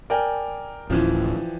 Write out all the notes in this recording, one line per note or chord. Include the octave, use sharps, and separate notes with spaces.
A#4 D5 G5 G#5
D1 A2 E3 F3 C#4